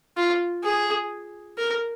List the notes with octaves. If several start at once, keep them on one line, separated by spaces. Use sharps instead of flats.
F4
G#4
A#4